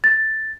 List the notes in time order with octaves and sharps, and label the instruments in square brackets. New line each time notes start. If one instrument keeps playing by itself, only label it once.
[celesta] A6